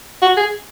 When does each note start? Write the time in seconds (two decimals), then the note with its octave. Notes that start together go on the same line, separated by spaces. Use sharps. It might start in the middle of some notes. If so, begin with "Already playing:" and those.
0.22 F#4
0.37 G#4